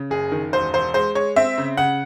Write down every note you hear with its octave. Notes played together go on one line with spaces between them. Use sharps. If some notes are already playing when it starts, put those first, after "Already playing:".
Already playing: C#3
F#1 G#4
D#3
E1 C5
E1 C5
G#3 C5
G#3 C#5
C4 E5
C#3
C#3 F#5